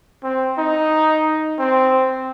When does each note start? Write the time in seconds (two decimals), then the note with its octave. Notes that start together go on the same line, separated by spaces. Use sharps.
0.24 C4
0.58 D#4
1.59 C4